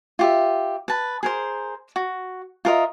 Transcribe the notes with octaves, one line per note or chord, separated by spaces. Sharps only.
F4 G4 E5
B4 A5
G#4 A#4 C5
F#4
F4 A#4 D#5 E5